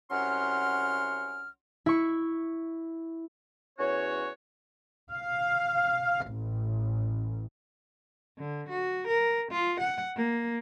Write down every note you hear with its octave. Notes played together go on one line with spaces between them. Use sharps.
C2 F#3 C#4 F#5 C6 F6
E4 C#6
E2 C#4 F#4 C#5
F5
A1
D3
F#4
A#4
F4
F#5
A#3